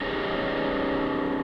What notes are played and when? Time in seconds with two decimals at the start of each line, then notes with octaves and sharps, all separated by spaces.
0.01 C#4 D#4 G4 G#4 B4 C#5